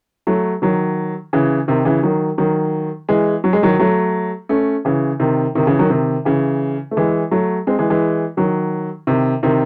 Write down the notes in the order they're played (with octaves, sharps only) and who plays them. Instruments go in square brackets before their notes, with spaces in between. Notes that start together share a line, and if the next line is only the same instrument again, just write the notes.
[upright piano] F#3 A3
D#3 F#3
C#3 E3
C3 D#3
C#3 E3
D#3 F#3
D#3 F#3
E3 G#3
F#3
G#3
D#3 F#3
F#3 A3
A3 C#4
C#3 E3
C3 D#3
C3 D#3
C#3 E3
D#3 F#3
C3 D#3
C#3 E3
A3
E3 G#3
F#3 A3
G#3 C4
E3 G#3
E3 G#3
D#3 F#3
C3 D#3
C3 D#3